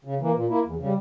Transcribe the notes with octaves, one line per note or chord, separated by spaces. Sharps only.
C#3
E3 A#3
A#2
A#3 E4
E2
C#3 G3